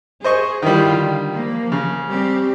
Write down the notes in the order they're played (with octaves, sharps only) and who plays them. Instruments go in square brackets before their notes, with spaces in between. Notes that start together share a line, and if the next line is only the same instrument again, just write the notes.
[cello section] G#4 [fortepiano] C5 D#5 C#6
[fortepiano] D#3 G3 [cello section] E4 F4
[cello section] D3
F3 A#3
[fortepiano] C#3
[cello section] G3 C4 G4